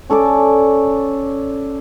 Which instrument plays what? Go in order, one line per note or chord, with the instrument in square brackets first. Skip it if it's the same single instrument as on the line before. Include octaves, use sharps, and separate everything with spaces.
[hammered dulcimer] C#4 A4 D5 D6